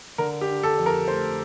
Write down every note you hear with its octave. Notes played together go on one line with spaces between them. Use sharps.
D3 A#4
G4
D4
A4
F2
A#4
A3 C5